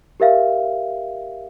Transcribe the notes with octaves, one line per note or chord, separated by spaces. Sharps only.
G4 A#4 E5 F5